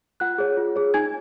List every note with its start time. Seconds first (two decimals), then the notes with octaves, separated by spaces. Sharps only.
0.20 F4 F#5 F#6
0.38 G#4 C#5
0.57 F4
0.76 G#4 C#5
0.94 D#4 G#5 G#6